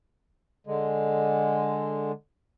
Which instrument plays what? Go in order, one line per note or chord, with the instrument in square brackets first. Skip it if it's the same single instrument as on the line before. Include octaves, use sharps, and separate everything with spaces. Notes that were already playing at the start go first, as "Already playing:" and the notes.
[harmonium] D3 G#3